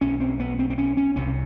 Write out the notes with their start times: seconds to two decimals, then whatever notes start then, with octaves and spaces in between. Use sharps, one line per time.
0.01 B1 B2 C#4
0.20 C4
0.40 B3
0.59 C4
0.70 C4
0.78 C#4
0.97 C#4
1.16 C2 C3 C#4